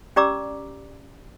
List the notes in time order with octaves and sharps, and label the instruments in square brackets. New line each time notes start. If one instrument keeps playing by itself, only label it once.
[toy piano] C#4 G4 D5 A#5 D6 E6